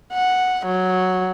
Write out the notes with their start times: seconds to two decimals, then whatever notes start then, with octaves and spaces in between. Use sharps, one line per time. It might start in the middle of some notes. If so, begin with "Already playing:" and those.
0.13 F#5
0.66 F#3